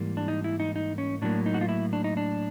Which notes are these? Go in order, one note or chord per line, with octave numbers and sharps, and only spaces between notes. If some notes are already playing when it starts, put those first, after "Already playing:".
Already playing: G#2 E3 G3 A#3
D4
D#4
E4
D#4
D#4
C#4
A2 F#3 A#3 D4
D#4
F#4
F4
E4
D4
D#4
D4